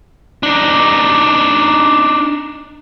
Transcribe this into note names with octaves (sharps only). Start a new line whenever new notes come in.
D4 D#4